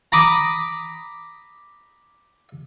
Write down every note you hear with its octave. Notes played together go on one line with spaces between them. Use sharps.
A#5 B5 D6 D#6